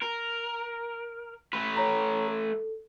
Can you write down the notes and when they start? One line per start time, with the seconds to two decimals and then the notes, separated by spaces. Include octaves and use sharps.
0.02 A#4
1.53 A3 B4
1.77 C#5 A#5
2.28 A4